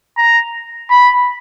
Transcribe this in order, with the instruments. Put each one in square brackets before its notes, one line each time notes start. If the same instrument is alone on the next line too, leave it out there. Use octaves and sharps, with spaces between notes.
[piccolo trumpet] A#5
B5